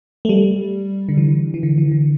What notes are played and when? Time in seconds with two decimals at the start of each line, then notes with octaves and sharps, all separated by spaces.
0.25 A3
0.29 G3
1.09 D3
1.18 E3
1.54 E3
1.63 D3
1.78 E3
1.92 D3